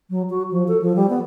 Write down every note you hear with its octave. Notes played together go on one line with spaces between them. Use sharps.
F#3
F#4
F3
A4
F3
G3
B3